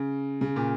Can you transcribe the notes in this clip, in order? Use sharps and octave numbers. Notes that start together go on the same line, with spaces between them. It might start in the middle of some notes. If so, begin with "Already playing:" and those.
Already playing: C#3
C#3
A#2